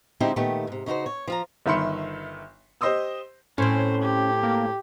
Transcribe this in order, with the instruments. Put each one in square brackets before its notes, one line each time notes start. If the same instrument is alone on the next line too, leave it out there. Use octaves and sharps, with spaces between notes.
[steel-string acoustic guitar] D3 G#3 C4 D#4 E4 G4
A#2 D#3 A3 B3 G4
G#2 C3
C#3 D#4 E4 F#4 C5
C#5
F3 F4 A#5
[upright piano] G1 D#3 E5 B5 C6 C#7
G4 C5 D#5 C6 D#6 E6
[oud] A2 C4 [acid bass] C#4 [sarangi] C5
[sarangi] G4
[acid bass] A#3